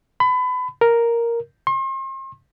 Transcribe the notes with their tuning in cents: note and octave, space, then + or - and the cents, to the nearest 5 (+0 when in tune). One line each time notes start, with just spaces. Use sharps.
B5 +30
A#4 +0
C6 +40